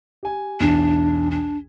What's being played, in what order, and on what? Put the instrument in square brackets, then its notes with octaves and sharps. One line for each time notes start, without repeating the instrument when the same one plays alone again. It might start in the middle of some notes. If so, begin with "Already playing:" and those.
[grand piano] G4 G#5
[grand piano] B1 E2 [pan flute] D4
[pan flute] D4